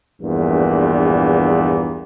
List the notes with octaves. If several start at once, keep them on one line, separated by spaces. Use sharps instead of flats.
A#1 E2 G2 A#2